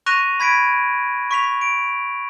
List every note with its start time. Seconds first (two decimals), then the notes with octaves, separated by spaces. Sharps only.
0.06 C#6 F#6 A#6 D#7 F7
0.40 B5 G#6 B6 D7
1.31 C#6 B6 F7
1.61 D7